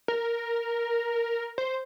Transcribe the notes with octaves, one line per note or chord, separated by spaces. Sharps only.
A#4
C5